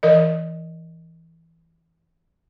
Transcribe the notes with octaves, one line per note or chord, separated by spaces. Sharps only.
E3 A#4 D#5